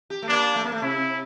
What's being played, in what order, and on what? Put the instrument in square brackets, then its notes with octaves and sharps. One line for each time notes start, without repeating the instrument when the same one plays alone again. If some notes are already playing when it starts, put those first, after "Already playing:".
[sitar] G4
A3
[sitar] A#3 [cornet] D4
[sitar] A3
A#3
A3
[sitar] C3 [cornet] E4